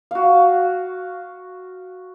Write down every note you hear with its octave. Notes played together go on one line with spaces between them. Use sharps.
F#4 F5